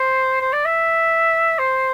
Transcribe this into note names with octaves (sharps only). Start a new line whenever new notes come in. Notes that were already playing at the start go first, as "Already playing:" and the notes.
Already playing: C5
C5
D5
E5
C5